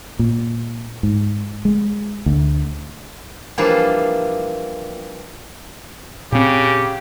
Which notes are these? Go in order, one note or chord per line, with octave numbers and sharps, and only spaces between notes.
A#2
G#2
G#3
D2
E3 F3 G3 A#3 D4 F4
A#2 C#3 C4 G4